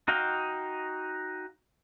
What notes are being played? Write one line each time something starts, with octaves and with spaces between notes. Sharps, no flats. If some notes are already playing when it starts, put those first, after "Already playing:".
D#4 F#4 D#5 F5 G5